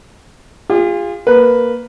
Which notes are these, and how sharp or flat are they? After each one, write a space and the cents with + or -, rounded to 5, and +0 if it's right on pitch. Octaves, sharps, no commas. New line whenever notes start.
F4 +0 G#4 -40
A#3 +0 B4 +0